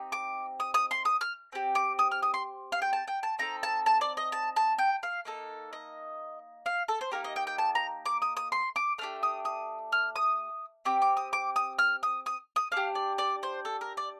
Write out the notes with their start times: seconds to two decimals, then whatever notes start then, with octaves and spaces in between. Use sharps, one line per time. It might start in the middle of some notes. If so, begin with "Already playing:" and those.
Already playing: C4 D#4 G4
0.12 D6
0.60 D#6
0.74 D#6
0.91 C6
1.05 D#6
1.21 F6
1.52 C4 G4
1.75 D6
1.99 D#6
2.11 F6
2.23 D#6
2.34 C6
2.72 F5
2.82 G5
2.93 A5
3.07 G5
3.23 A5
3.39 C4 D#4 A4 A#5
3.63 A5
3.86 A5
4.01 D5
4.17 D#5
4.32 A5
4.56 A5
4.78 G5
5.03 F5
5.25 A#3 D#4 A4
5.73 D#5
6.66 F5
6.88 A4
7.01 C5
7.12 A#3 D#4 G4 A#4
7.24 D#5
7.36 G5
7.47 G5
7.58 A5
7.75 A#5
8.06 D6
8.22 D#6
8.37 D#6
8.52 C6
8.76 D6
8.98 A3 D4 G4 F6
9.23 D#6
9.45 D#6
9.92 F6
10.16 D#6
10.85 C4 G4 D6
11.02 D6
11.17 D#6
11.33 D6
11.56 D#6
11.79 F6
12.03 D#6
12.26 D#6
12.56 D#6
12.72 D4 G4 F5
12.95 D5
13.18 D5
13.43 C5
13.65 A4
13.81 A#4
13.97 D5